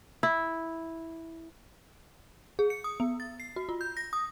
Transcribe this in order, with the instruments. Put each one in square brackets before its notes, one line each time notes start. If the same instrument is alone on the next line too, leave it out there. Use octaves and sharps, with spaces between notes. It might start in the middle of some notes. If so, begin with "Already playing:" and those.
[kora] E4
[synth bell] G#4
C#7
D#6
B3
A6
C7
F#4
F4
G6
A#6
D#6